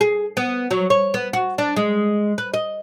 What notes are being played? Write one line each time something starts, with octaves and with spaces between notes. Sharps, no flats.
G#4
B3
F#3
C#5
B3
F#4
D4
G#3
B4
D#5